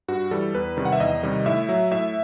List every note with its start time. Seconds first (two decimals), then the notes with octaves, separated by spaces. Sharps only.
0.08 G2 F#4
0.31 E3 G3 A4
0.55 E2 B4
0.77 C3 D#3 G3
0.85 F#5
0.92 E5
1.00 E2 D#5
1.23 C3 D#3 G3
1.46 A2 E5
1.69 F#3
1.91 A2 E5